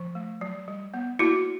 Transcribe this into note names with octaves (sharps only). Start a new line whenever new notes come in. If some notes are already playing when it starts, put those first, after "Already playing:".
Already playing: F3
A3
F#3
G3
B3
A#3 E4 F#4